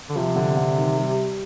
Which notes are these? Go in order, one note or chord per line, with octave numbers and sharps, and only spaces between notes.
D3
C3 F3
D3
D3
D#3
G3